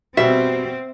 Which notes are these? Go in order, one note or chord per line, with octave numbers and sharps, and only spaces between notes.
B2 G3 C4 E5